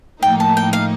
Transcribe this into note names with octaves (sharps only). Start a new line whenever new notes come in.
A2 F3 A#3 D#4 G5
A5
G5
F5